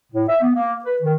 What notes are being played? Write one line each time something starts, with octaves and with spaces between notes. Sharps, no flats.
A2
E5
B3
A#3
B4
D#3